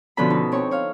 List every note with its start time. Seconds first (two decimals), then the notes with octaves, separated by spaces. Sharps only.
0.17 B2 D3 F3 C#4 A4 B5
0.30 D#4
0.52 C4 C#5 C#6
0.71 C#5 F5